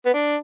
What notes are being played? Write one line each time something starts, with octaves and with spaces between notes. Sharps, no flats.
B3
D4